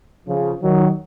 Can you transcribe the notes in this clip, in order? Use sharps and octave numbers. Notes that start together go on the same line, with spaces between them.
C#3 F3
D#3 F#3